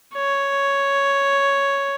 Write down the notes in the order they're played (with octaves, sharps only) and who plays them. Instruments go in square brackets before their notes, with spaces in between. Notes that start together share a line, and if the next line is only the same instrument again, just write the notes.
[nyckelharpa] C#5